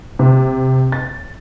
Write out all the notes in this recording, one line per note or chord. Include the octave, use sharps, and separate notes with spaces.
C3
A6